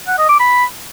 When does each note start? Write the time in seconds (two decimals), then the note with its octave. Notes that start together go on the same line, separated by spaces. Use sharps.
0.07 F#5
0.18 D#5
0.29 D6
0.40 B5